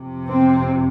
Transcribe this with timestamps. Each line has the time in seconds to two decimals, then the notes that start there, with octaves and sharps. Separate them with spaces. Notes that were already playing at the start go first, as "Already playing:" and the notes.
Already playing: F2 C3
0.27 C4